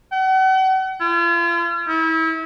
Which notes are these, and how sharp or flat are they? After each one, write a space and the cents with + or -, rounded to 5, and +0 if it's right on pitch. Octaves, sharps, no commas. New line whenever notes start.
F#5 +40
F4 -40
E4 -35